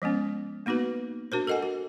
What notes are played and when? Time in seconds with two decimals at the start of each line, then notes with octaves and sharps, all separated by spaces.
0.02 F3 G#3 B3 C#4
0.66 A#3 B3 D#4 F#4 B4
1.32 D4 F#4 A#4 C5
1.47 A4 A#4 D#5 F#5 G#5
1.63 F#4